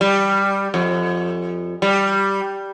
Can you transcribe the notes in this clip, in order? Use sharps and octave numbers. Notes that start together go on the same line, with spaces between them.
G3
F2
G3